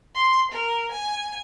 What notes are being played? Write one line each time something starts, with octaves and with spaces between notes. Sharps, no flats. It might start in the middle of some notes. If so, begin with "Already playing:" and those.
C6
A#4
G#5